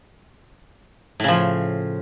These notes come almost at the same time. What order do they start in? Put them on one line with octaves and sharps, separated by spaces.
A2 C#3 F3